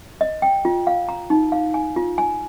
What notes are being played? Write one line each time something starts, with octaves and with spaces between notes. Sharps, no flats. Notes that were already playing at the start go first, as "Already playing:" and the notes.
D#5
G5
F4
F5
A#5
D#4
F5
G#5
F4
G#5